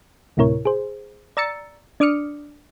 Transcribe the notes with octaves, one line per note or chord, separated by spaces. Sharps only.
D2 A2 C3 E4 A#4 C#5
G#4 C5
D5 A#5 E6 A6 C#7
D4 D5 D6 D#6 F6 C#7